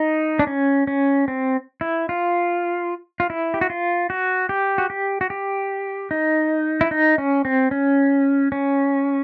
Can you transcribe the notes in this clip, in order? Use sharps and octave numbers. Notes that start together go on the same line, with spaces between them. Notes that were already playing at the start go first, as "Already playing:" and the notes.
Already playing: D#4
D4
C#4
C#4
C4
E4
F4
F4
E4
G4
F#4
F4
F#4
G4
F#4
G4
F#4
G4
D#4
E4
D#4
C#4
C4
C#4
C#4